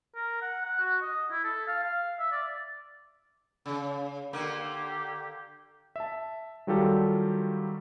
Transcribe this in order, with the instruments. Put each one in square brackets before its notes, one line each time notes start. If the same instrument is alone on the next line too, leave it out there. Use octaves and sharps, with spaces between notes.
[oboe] A#4
F#5
F#5
F#4
D#5
E4
A4
F5
F5
E5
D5
[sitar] C#3
[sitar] D3 A#3 [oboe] G4
[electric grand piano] E5 A5
D#3 F#3 G3 F4 G4 A4